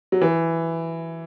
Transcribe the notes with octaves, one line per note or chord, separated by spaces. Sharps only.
F#3
E3